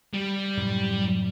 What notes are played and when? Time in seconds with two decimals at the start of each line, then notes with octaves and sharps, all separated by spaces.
0.14 G3
0.57 F#2 A2 C3